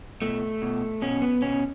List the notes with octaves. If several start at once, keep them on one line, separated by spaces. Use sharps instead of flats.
B2 A3
B2
B2 C#4
B3
B2 C#4